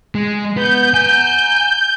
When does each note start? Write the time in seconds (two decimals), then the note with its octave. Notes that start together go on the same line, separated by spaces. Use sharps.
0.15 G#3
0.56 B3 B4 G6
0.94 F#5 G#5